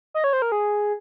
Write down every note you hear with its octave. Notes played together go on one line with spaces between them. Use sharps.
D#5
C#5
C5
A#4
G#4